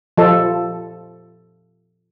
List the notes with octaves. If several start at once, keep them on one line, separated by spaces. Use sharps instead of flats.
F3 A4